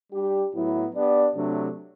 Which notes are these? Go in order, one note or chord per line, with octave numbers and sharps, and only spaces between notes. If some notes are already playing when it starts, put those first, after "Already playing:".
G3 D4 G4
A2 F#3 B3 E4
B3 D4 G4 D5
C3 F#3 A3 D4